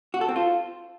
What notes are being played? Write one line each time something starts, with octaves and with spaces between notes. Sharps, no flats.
F#4
A4
C4
F4